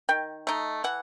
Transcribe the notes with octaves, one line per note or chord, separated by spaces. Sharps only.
D#3 G5
A3 D#4
E3 F#5